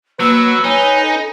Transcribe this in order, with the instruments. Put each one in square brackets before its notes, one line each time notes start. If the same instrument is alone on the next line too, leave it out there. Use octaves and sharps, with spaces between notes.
[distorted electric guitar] F#3 [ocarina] A#3 [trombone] B4 [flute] E6
[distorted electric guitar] D#4 [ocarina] C#5 [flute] G#5
[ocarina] A4